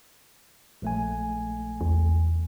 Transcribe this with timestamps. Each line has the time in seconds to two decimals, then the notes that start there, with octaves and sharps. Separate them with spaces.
0.82 A#1 A3 G#5
1.81 E2